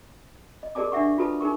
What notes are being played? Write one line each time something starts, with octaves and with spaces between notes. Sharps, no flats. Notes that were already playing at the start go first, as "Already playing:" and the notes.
D#5
G4 G#4 A#4 D5 A5 D6
D4 G4 E5 F#5 C#6
F4 F#4 A4 B4 A5
D#4 G#4 A#4 C#6